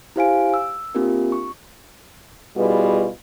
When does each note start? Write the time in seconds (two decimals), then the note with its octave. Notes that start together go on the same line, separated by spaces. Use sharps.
0.16 E4 G4 C5 F5 G#5 D7
0.54 E6
0.95 A#3 C4 D4 F4 G4 A#4
1.32 C#6
2.57 B2 G3 E4 F4 G#4 B4